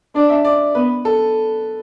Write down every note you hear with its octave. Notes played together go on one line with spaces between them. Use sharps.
D4 D5
E5
D5
B3 B4
A4